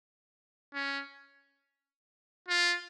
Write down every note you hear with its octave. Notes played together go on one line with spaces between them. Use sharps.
C#4
F4